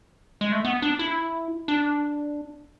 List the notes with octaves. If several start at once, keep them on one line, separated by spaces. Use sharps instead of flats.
G#3
A3
B3
D4
E4
D4